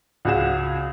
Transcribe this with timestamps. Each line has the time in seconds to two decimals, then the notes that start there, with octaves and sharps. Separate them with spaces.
0.25 C#2 C#4 F#4 G#4 E7